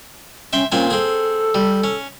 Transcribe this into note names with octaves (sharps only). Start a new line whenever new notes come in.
C#4 E5 G5 C6
A#2 C4 C#4 G#5
C4 G#4 A4
G3
C#4